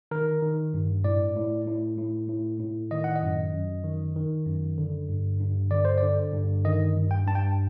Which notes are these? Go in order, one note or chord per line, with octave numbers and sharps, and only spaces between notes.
D#3 A#4
D#3
G2
A2 D5
A2
A2
A2
A2
A2
D#3 D#5
F#5
D#5
F#2
F#2
D#3
D#3
F#2
D3
G2
G2
D3 D5
C5
D3 D5
G2
D#3 D#5
G2
G5
G2 A5
G5